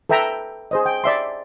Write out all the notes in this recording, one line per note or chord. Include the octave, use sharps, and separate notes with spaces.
A4 B4 E5 G5 A#5
G#4 C5 D#5
G5
D5 E5 C6